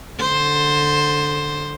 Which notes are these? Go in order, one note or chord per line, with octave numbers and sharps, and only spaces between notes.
D3 C5